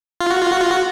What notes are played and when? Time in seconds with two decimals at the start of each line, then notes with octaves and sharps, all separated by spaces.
0.21 F4
0.30 F#4
0.41 F4
0.51 F#4
0.60 F4
0.71 F#4